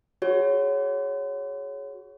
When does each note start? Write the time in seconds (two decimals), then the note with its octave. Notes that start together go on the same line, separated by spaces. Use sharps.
0.22 F#4 G#4 C#5